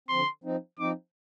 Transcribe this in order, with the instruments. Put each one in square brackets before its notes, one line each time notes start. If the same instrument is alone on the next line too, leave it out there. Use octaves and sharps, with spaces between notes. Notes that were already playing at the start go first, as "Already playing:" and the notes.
[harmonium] D3 F3 C4 [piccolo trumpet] C6
[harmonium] F3 C4 D#4
[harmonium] F3 C4 D#4 [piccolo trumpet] D6